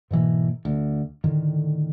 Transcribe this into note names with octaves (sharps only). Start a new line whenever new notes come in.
G#2 B2 E3 A#3
D2
A2 D3 D#3